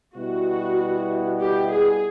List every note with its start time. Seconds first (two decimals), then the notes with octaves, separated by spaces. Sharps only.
0.16 B2 G3 B3 E4 F#4
1.41 G4
1.72 G#4